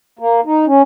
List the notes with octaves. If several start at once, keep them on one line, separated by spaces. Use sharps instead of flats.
A#3
D#4
C#4